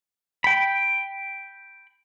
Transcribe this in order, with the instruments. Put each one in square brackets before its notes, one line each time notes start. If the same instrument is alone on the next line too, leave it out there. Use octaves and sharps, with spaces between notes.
[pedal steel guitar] G5 B5